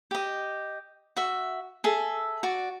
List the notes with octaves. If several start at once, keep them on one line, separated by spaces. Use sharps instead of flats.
G4 D#5
F#4 E5
G#4 A4 E5
F#4 D5